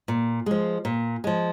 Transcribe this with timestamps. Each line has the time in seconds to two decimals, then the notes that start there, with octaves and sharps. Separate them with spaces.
0.08 A#2
0.46 F3 G#3
0.85 A#2
1.24 F3 G#3